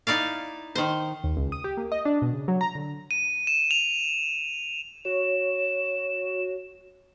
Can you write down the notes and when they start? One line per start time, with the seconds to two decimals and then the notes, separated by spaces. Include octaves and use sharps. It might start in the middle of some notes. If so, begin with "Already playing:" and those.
0.07 D#4 E4 D5 F5
0.75 D#3 C5
1.24 D#2
1.37 C#2
1.52 D#6
1.64 G4
1.77 A#3
1.92 D#5
2.05 D4
2.22 B2
2.33 C#3
2.48 F#3
2.61 A#5
2.75 D3
3.11 D#7
3.47 E7
3.71 F7
5.05 F#4 C#5 E7